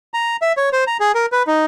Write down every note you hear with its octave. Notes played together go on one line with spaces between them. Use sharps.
A#5
E5
C#5
C5
A#5
G#4
A#4
B4
D#4